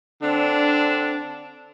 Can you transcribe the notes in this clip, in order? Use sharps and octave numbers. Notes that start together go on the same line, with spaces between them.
D3 C4 D4